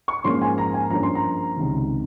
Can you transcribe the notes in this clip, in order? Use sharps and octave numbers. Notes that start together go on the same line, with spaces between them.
C#6
G#2 F3 A#3 C#4 C6
G#5
A#5
G#5
G2 F3 A#3 C#4 A#5
C6
A#5
C#2 C3 D#3